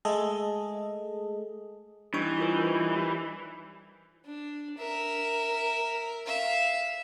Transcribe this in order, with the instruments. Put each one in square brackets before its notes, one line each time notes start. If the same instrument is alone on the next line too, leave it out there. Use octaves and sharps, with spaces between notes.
[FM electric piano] G#3 A3 G#4 A4 D#5
[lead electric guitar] E3 [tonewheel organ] G3 D#4 [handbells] D4 C#6
[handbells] F4 A#4 C5
[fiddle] D4
A#4 E5
E5 F5